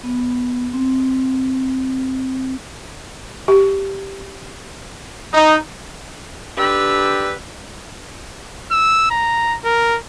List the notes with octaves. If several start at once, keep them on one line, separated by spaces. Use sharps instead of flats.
B3
C4
G4
D#4
D3 D4 G4 B4 E6
E6
A#5
A#4